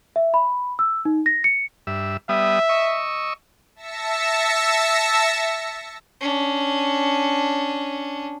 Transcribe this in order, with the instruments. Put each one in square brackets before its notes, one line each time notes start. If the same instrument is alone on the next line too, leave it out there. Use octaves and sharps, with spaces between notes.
[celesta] E5
B5
E6
D#4
A#6
C#7
[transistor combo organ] G2 E5
[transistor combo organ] G3 B3 D#6 [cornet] E5
[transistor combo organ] D#5 C#6 E6
[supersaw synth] E5 A5 E6 A#6 C#7
[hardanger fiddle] C#4 D4